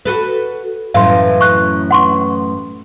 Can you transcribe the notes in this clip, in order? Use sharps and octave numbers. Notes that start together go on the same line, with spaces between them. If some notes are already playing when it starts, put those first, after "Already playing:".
F#4 A4 B4
F#2 A2 E3 F5 C6
C#6 F#6
F#5 C6 C#6